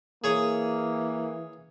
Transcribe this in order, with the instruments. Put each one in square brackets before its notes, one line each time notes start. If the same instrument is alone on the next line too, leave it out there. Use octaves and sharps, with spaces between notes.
[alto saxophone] E3 [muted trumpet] A#3 [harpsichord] G#4 C#5 D#6